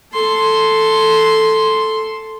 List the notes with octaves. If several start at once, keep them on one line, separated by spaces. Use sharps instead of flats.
A4 C6